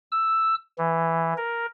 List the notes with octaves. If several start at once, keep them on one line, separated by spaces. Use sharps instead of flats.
E6
E3
A#4